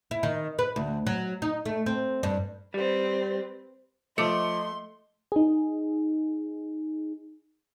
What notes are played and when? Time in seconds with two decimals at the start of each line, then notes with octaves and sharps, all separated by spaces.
0.11 E4
0.23 D#3
0.59 B4
0.76 D2
1.07 F#3
1.42 D#4
1.66 A3
1.86 C4
2.23 G2
2.74 G3 C4 B4
4.18 F3 A3 D#5 C6 D6 C#7
5.32 D#4 G#4